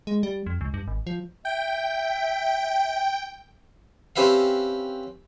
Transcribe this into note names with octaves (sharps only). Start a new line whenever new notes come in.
G#3
G3
F2
C#2
G2
G#1
F3
E5 G5
C4 C#4 G4 B4 E5 F5